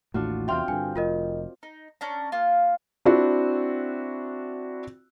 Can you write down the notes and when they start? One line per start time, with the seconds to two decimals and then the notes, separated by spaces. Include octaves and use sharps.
0.14 A1 D#2 A2 D4 F4 F#4
0.48 E2 C3 C4 E5 F5 G5 C6
0.68 G2 B2 D3 G#5
0.96 F1 F4 A#4 D#5
1.63 D#4
2.01 C#4 D4 A#5
2.32 A#3 F4
3.05 C4 D4 E4 F#4